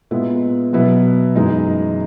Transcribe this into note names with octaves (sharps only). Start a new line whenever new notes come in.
A#2 G#3 B3 E4
B2 F#3 B3 E4 B4
F#2 E3 G#3 D#4